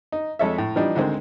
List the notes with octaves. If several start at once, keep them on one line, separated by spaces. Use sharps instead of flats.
D#4
F2 G#3 A4 C#5 E5
A2
E3 F3 G3 D4 D#4
D2 D3 D#3 G#3 C4